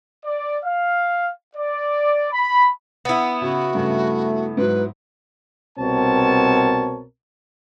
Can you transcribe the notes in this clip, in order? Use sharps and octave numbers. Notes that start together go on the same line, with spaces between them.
D5
F5
D5
B5
B3 E4
C#3 F#4
G2 C#3 A3
G#2 F#3 B4
C2 B2 C4 A#4 C#5 A5